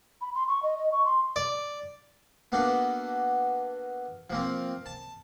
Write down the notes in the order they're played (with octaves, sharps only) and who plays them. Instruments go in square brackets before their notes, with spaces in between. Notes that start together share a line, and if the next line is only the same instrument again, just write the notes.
[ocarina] B5
C6
C#6
D#5
D#5
C#6
C6
[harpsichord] D5
A#3 B3 D4 F#4 A4
F3 A#3 C4
A5